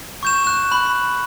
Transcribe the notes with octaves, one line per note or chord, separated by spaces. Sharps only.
C#6 G6 E7
F#6 E7
B5 F#6 F#7